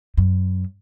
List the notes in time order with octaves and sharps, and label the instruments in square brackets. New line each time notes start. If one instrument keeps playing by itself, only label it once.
[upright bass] F#2